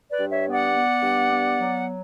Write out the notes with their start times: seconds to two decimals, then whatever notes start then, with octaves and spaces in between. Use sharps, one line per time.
0.10 B4 D5
0.18 G2
0.31 C#5 E5
0.46 B3
0.52 D5 F#5
0.74 B3
1.02 G2
1.30 B3
1.58 F#3